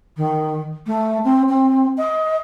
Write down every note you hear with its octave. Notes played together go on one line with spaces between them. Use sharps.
D#3
A3
C4
C4
D#5